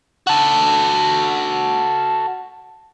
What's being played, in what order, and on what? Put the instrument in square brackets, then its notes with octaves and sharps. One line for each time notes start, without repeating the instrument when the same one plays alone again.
[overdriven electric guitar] F#4 A4